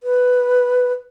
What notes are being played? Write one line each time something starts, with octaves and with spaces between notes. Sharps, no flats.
B4